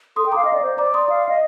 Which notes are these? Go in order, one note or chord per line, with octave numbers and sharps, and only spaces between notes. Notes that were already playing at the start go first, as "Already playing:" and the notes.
A4 C6 D#6
G5
F5 A#5 D6
D#5
D5
C5
D5 A#5 D6
C6 D#6
F5
D#5